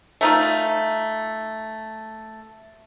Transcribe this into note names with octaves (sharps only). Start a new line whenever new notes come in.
A3 D#4 F4